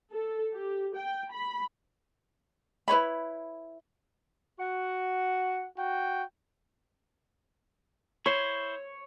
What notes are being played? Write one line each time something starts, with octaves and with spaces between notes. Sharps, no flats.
A4
G4
G5
B5
E4 B4 C#5 B5
F#4 F#5
F#4 G5
E4 C5 C#5